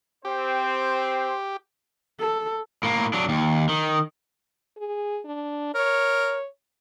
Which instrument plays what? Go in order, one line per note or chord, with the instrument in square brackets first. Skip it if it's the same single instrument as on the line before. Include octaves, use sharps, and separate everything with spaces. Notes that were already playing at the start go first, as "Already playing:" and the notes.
[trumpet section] C4 C5 [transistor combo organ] G4
[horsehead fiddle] A4
[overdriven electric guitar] A2 A#3
F#3 D4
D#2
D#3
[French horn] G#4
D4
[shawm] A#4 [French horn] C#5